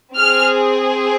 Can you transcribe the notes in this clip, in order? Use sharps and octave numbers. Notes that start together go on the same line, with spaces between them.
C4 F6
G#4